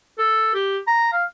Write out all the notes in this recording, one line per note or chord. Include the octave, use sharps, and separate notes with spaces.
A4
G4
A#5
F5